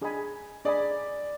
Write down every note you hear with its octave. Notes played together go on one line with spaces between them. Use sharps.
D4 G#4 D#5 G#5 B5
D4 G#4 D5 D#5 G#5 B5